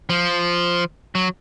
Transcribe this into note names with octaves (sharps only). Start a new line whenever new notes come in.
F3
F#3